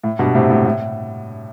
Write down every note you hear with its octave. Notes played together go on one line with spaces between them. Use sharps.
A2
G2 B2
A2 C3
A2
A2